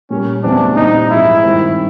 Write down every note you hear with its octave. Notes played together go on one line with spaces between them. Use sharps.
A#2 G3 A#3 C#4
E2 C#3 E3 A3 C4 D4
A#2 G3 C4 D#4
G#2 F3 G#3 E4
G2 D#3 G3 C4